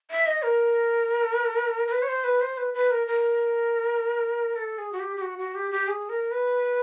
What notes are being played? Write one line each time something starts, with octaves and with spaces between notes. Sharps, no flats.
E5
D#5
A#4
A#4
B4
C#5
C5
B4
C5
B4
B4
A#4
A#4
A4
G#4
F#4
G4
G4
F#4
F#4
G4
G4
G#4
A#4
B4